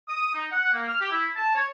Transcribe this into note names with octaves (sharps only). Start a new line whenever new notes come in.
D#6
D#4
F#5
A#3
F6
G4
E4
A5
C#5